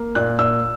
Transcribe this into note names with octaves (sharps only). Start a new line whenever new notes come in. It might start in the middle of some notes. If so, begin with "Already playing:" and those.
Already playing: A#3
A#2 F#6
A#2 E6